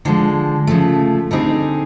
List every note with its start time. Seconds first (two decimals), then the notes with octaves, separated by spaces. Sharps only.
0.05 D3 F3 G#3
0.67 C#3 F3 A3
1.31 D3 G3 C4 D#4 G#4